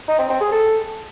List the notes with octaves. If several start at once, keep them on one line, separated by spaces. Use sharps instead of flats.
D#4
C4
C4
G#4
A4